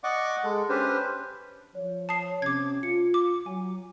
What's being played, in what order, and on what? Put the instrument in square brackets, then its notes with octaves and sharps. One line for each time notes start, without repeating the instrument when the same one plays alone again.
[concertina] D5 D#5 F#5 C#6 D6
G#3 A4
C#4 D4 G4 B4 C5
[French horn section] F3 C#5
[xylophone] A5 D#6 C7
[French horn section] C3 C#4 [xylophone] D6 G#6
[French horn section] F4 [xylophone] C#7
[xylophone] D6
[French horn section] F#3 [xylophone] G#5